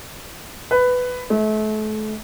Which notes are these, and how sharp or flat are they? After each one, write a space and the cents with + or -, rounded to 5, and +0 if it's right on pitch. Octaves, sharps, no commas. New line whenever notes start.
B4 +10
A3 -35